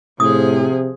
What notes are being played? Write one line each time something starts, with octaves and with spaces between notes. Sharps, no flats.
A2 C3 F3 G#4 D#6